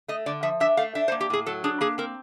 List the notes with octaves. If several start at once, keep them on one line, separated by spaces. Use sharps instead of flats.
A3 D#5
D3 D5
F3 E5
D4 E5
A3 F5
D4 E5
C5
A#3
G4
A2 G#4
F#3 A4
D4 G#4
A#3 G#4
C4 A#4